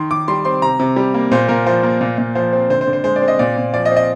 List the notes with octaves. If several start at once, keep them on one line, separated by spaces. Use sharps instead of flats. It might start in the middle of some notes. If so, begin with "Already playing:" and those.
Already playing: D#3 C6
D#3 D6
G3 C6
C4 C6
C3 A#5
C3
G3
A#3
A#2 C5
A#2 A#4
F3 C5
A#3
A#2
A#2
F3 C5
C4
D3 C5
C5
D3
C5
G#3 C5
D5
C4
D#5
A#2 D5
A#2
F3 D5
D#5
C4
D#5